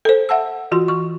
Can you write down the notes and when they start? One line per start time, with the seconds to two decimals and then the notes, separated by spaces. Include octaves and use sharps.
0.05 A4 C5
0.29 E5 F#5 A5 E6
0.72 E3 F4 F#4 C6
0.88 E3 C#6